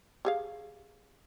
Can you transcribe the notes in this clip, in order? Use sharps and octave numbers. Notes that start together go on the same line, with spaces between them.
G4 G#4 F5